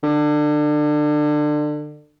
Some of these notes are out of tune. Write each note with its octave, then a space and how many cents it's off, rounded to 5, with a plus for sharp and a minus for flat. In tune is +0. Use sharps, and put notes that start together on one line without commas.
D3 +25